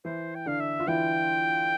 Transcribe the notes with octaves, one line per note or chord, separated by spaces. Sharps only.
E3 E4 C5
G5
D3 D4 F5
E5
F4
E3 E4 G5